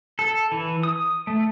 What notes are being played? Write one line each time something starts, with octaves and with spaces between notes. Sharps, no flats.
A4
E3
D#6
A3